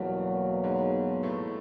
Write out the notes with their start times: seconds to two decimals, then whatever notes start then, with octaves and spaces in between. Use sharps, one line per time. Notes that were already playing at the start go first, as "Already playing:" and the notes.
Already playing: E2 G2 B2 F#3 G3 A#3
0.64 G#2 G#3
1.23 A2 A3